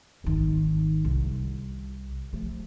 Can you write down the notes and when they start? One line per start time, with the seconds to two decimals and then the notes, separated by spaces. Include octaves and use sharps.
0.24 G#1 D#3
1.05 C2
2.33 F3 A3